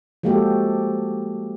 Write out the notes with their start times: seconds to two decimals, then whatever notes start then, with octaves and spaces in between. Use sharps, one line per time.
0.23 F3 G#3 A#3 F#4 G4 A4